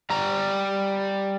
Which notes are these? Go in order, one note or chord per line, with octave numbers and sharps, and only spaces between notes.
G3 A#5